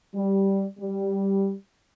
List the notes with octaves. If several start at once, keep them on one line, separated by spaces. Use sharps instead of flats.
G3
G3